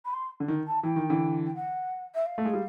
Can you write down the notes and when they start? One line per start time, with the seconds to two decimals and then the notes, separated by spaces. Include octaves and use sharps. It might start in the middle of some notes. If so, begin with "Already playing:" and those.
0.04 B5
0.13 C6
0.40 D3
0.48 D#3
0.67 A5
0.83 E3 G5
0.96 D#3
1.10 D3 E3
1.45 G5
1.54 F#5
2.14 E5
2.26 F5
2.38 A3
2.45 G#3
2.53 G3